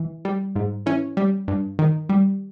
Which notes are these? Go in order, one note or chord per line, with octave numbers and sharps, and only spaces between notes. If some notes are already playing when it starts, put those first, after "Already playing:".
Already playing: E3
G3
G#2
E3 C#4
G3
G2
D#3
G3